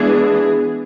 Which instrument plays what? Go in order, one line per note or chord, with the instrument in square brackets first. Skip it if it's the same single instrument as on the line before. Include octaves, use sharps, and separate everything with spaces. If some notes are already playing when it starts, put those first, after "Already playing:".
Already playing: [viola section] E3 G#3 B3 D4 G#4